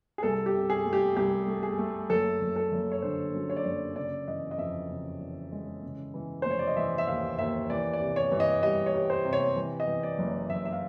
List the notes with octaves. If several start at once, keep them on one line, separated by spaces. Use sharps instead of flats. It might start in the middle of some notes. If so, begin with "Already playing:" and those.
G#4
C2 A4
G4
C3
G#4
A3
G4
C2 G4
A3
G#4
A3
F#1 A4
F#1
A4
F#1
C#5
D3 C5
F#2
C#5
D5
F#1 C#5
C#3 D5
E3 D#5
D#5
F2 E5
C#3
E3
G#3
C#3
E3
F1 C5
C#5
D5
D#5
E3 E5
E5
D#2 F5
D#2 E5
E3 D5
D5
C3
C#5
E3
D#5
G3 D#5
C#5
G3
C5
C3
C#5
E3
D#5
E3
D5
F#1
F#1 E5
E5
F5